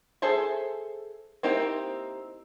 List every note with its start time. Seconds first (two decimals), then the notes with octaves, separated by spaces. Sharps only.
0.22 G#4 A4 C5 E5
1.43 A#3 C4 D#4 E4 G4